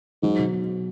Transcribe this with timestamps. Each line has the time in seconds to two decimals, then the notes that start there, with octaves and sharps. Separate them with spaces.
0.23 G#2 F#3
0.39 B2